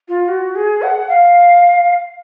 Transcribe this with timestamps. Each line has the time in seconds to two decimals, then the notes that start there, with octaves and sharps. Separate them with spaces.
0.08 F4
0.28 F#4
0.55 G#4
0.82 F#5
1.09 F5